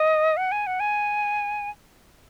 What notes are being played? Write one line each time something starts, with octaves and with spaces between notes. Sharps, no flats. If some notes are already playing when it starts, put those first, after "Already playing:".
Already playing: D#5
F#5
G#5
F#5
G#5